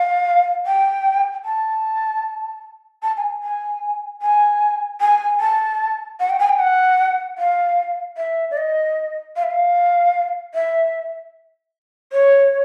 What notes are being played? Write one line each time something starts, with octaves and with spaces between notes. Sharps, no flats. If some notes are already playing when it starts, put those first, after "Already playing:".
Already playing: F5
G5
A5
A5
G#5
G#5
G#5
G#5
A5
F#5
G5
G#5
G5
F#5
F5
E5
D5
D#5
F5
E5
F5
E5
C#5